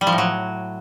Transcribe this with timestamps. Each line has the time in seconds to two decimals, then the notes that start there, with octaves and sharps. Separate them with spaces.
0.01 G3
0.07 F3
0.12 A2
0.18 F#3